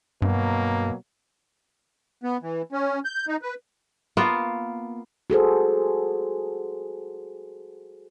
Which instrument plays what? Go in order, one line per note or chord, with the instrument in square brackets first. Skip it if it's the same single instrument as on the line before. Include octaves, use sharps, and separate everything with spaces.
[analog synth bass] G2 [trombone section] B2 F#3 A#3
[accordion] B3
E3
C#4
G6
D#4
B4
[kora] A#3 B3 F4
[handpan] F#4 G#4 A4 C5